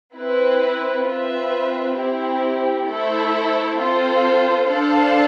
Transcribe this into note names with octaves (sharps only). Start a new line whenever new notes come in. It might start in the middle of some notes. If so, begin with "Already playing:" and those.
C4 E4 B4
C4 F4 B4 E5
C4 E4 G4
A3 E4 A4 C5 E5
C4 F4 A4 C5
D4 A4 C5 F5 A5